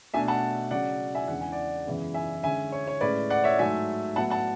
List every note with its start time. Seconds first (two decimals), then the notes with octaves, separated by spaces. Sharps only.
0.14 B2 A3 D4 E5 G#5
0.28 F#5 A5
0.71 C#3 F#3 C#4 D5 F#5
1.15 E5 G#5
1.28 E2 C#3 G#3 D4 F#5
1.41 G#5
1.52 D5 F#5
1.87 F#2 C#3 E3 G#3 B3
2.14 E5 G#5
2.43 D3 G#3 C#4 E5 G#5
2.72 C#5
2.88 C#5
3.01 A2 G#3 C#4 B4 D5
3.30 D5 F#5
3.44 C#5 E5
3.59 G#2 F#3 A3 E5 G#5
4.16 A2 F#3 B3 E4 F#5 A5
4.30 F#5 A5